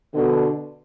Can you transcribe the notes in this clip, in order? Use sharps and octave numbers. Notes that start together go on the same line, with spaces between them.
B2 D3